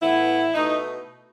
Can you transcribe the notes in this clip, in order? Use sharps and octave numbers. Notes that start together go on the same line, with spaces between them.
A2 E3 B3 E4
B2 A3 D#4